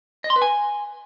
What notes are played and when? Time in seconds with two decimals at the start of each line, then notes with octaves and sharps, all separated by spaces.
0.24 D#5
0.30 C6
0.36 B4
0.42 G#5